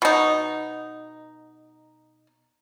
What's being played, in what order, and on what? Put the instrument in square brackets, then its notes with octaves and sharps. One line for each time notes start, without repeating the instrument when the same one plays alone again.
[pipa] B2 D#4